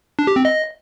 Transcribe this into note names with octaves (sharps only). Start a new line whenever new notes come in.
D4
G4
C4
D#5